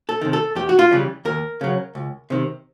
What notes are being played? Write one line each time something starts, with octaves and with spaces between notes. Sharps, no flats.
A4
C3 D#3
A4
E2 G4
F#4
F4
C#3 E3 G3
D#2 A#4
C#3 F#3
C#2
C3 D#3